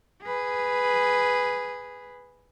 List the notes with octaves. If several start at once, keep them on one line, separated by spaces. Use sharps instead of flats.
G#4 B4